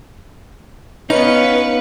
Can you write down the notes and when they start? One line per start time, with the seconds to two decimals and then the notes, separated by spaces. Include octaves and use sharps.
1.10 B3 C#4 D#4 B4 F5 C#7